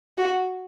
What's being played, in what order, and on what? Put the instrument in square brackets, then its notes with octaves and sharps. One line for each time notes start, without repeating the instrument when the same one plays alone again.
[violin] F#4